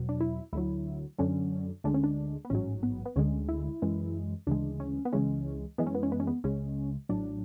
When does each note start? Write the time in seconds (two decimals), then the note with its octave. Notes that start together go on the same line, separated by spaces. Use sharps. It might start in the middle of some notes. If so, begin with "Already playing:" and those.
Already playing: E2 B2 F#3
0.09 D4
0.21 E4
0.53 D2 D3 F#3 E4
1.19 F#2 D3 F#3 C#4
1.84 D2 D3 G#3 D4
1.94 C#4
2.04 D4
2.45 B3
2.50 A1 G#2 F#3 C#4
2.83 B3
3.06 B3
3.16 D2 D3 G#3 C#4
3.49 E4
3.82 F#2 E3 G#3
4.47 D2 C#3 E3 G#3 D4
4.80 C#4
5.05 B3
5.13 C#2 C#3 E3 G#3 C#4
5.78 F#2 E3 G#3 B3
5.87 C#4
5.95 B3
6.03 C#4
6.12 B3
6.20 C#4
6.27 B3
6.44 C#2 C#3 G#3 C#4
7.09 A1 A2 F#3 D4